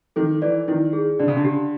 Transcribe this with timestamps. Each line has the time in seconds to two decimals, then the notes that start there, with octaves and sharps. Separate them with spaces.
0.16 D#3 A4
0.42 E3 D5
0.68 D#3 E4
0.93 G#4
1.19 D3 D5
1.28 C#3
1.37 D3
1.45 G4